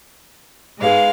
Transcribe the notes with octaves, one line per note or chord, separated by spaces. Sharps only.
G#2 G#3 B3 F5